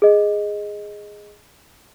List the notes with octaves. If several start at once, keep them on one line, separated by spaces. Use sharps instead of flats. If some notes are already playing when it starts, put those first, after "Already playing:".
G#4 D#5